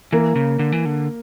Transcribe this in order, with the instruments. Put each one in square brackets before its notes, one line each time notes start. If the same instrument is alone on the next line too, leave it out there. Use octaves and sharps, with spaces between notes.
[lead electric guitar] E3 [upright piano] A#3
[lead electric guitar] C#3
D3
E3
D3